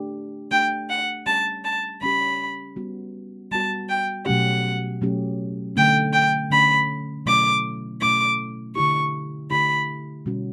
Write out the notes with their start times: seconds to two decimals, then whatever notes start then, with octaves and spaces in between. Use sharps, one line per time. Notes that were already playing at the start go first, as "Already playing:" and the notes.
Already playing: A3 D4 G4
0.51 A3 D4 G4 G5
0.89 F#5
1.26 G3 C#4 G4 A5
1.64 A5
2.01 G3 C#4 G4 B5
2.76 G3 B3 F#4
3.51 G3 B3 F#4 A5
3.89 G5
4.26 B2 F#3 A3 C#4 G4 F#5
5.01 B2 F#3 A3 C#4 G4
5.76 D3 A3 C#4 G5
6.13 G5
6.50 D3 A3 C#4 B5
7.26 B2 F#3 A3 C#4 E4 D6
8.01 B2 F#3 A3 C#4 E4 D6
8.75 D3 A3 E4 G4 C#6
9.51 D3 A3 E4 G4 B5
10.26 B2 G3 C#4 F#4